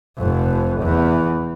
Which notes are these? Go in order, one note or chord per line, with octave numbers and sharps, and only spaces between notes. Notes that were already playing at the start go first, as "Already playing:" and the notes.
F1 F2
E2